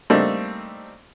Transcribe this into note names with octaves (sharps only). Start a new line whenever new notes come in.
G3 A3 A#3 C4 D4 D#4